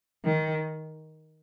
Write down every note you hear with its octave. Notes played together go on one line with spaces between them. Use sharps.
D#3